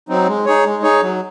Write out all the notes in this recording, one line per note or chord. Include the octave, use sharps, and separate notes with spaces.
F#3 C4 D#4
G#3
D#4 G#4 C#5
G#3
D#4 G#4 C#5
F#3